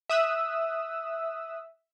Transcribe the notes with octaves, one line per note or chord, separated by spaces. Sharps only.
E5 D#6 E6 F#6